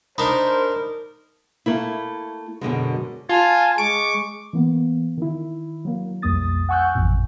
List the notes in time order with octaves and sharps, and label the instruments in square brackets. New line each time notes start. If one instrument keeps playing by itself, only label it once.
[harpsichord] D4 D#4 [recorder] A#4 [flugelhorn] C5 [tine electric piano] B5
[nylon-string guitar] A3 A#3 E4
F#2 B2 D3 G#3
[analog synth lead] F4 [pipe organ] G#5 A5
[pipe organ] G#3 C#6 [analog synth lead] D6
[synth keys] E3 A#3 B3
D#3 E4
F#3 A#3
B1 F2 G3 A#3 D#6 A6
F#5 G#5 C#6 E6 F#6 G6
A1 F2 A#2